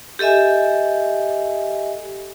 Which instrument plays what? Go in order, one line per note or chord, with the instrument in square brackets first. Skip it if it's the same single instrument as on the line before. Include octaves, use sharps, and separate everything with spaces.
[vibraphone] G4 A4 D#5 E5 G#5